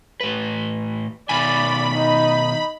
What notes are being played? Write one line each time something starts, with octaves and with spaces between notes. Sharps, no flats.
A2 B4
B2 D#3 D5 G#5 B5
D#4